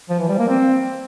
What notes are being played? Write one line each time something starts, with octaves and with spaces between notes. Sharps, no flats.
F3
E3
G3
A#3
C4